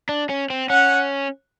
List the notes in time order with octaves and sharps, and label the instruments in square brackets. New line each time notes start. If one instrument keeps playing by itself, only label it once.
[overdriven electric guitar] D4
C#4
C4
[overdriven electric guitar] C#4 [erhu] F#5